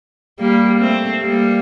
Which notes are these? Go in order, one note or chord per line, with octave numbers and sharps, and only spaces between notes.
G3 A#3
A3 C4
G3 A#3